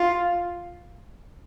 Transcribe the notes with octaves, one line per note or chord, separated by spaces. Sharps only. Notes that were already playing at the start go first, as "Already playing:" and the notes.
Already playing: F4